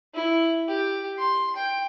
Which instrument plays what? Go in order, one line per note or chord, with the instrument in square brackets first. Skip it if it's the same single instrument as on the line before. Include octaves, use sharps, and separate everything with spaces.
[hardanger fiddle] E4
G4
C6
G5